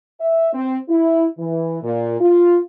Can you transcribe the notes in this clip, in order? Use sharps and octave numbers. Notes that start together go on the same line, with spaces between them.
E5
C4
E4
E3
A#2
F4